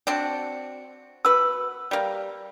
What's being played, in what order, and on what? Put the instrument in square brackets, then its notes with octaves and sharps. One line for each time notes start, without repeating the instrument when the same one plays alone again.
[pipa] C4 D4 F#4
[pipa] F#4 B4 [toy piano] E6
[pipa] G3 A#3